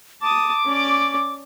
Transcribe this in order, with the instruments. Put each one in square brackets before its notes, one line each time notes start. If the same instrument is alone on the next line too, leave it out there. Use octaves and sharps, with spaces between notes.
[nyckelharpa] A5 D#6 [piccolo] D6
[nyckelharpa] C#4 D5